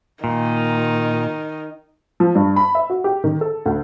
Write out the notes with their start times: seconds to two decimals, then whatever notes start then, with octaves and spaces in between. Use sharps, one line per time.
0.24 A#2 D#3
2.20 F3
2.35 G2
2.56 B5
2.75 E5
2.90 F#4
3.04 G4
3.24 D#3
3.41 A4
3.66 D2